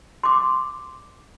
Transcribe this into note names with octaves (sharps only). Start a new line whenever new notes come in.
C6 D6